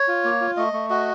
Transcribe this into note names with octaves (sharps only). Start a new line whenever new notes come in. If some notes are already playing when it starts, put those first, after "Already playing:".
Already playing: C#5
F4
A#3
F4
A3 D#5
A3
F#4 D#5